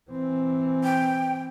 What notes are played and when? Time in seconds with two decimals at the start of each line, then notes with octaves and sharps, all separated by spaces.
0.11 E3 C4
0.84 G5